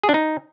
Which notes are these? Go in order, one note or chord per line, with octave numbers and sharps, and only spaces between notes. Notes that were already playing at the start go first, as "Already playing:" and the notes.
G#4
D4
D#4